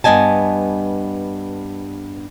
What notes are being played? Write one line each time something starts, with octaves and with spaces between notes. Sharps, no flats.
G2 B3 D#5 G#5 A5